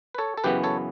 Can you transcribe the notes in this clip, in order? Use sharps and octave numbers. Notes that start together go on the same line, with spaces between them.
B4
A4 C#5
A4
F#2 C#3 E3 B3 G4 B4
A4 C#5